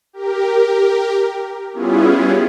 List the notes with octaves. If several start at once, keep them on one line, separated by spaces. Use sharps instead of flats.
G4 A#4
G3 B3 C#4 E4 F4 G#4